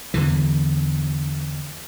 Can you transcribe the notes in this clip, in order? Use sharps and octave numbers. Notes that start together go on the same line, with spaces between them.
E2 D3 E3